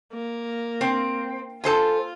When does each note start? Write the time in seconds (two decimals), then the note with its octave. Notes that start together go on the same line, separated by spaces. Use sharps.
0.14 A#3
0.81 C4
1.64 F4 A4 C5 G#5